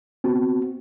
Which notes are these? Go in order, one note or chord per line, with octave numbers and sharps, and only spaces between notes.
B3 C4 F#4